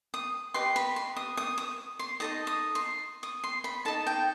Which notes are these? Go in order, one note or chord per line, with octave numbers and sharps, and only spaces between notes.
D#6
G4 B4 D#5 C6
B5
C6
D#6
D#6
D#6
C6
D#4 A4 D#5 D#6
D#6
C6
D#6
C6
B5
D#4 A4 D#5 A5
G5